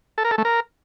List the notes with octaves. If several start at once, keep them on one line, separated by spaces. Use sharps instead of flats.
A4
A#4
A4
A3
A#4